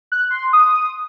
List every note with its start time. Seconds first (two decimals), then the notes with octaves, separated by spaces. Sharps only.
0.12 F#6
0.30 C6
0.53 D#6